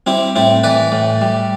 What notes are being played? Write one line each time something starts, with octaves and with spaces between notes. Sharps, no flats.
G3 C4 E4
A2 C4 E4
E3 B4 D5
A2
G3